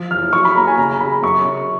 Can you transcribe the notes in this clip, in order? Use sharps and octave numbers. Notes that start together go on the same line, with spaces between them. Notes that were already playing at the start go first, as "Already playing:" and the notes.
Already playing: F3
F#1 F6
F#3 C#6
B5
A#3 A#5
G#5
C#3 A#5
C#3 B5
F#2 C#6
C#3